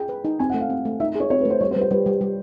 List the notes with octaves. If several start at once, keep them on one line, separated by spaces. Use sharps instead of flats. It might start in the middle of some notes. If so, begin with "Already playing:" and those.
Already playing: G#4 G5
B4
D#4
C4 G#5
F#5
A3
F5
C4
A3
D#4 E5
G#4 C#5
C4 C#5
B4
A3 C5
G3 C#5
C5
G3 B4
C5
G3 B4
G3
G3